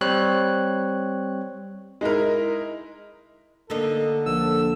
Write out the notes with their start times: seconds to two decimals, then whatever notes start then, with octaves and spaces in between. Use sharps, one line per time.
0.01 G3 C4 C#5 F#6
2.01 G#3 D#4 E4 A#4
3.70 D3 A#3 D#4 A4
4.26 A#1 E6